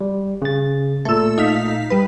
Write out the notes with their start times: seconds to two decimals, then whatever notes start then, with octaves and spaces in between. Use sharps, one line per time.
0.01 G3
0.42 C#3 A6
1.05 A#2 A3 A4 E6
1.38 D#4 F5 B6
1.90 G3 B4